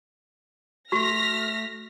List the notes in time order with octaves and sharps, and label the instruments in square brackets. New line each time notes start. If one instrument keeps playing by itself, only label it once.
[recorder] A3 [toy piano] F#4 C#6 [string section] F6 A#6 B6